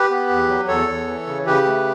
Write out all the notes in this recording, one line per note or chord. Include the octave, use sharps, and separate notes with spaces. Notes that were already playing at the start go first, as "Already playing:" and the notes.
Already playing: G4 B4
B3
E2
F#3
E2 A4 C#5
E2
E3
C#3
C#3 G4 B4
A3